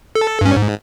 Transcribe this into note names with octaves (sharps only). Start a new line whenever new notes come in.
A4
G2 C#4
G#2